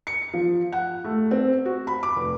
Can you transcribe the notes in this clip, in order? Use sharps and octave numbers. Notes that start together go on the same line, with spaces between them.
C#7
F3
F#5
A3
C4
F#4
B5
D6
F1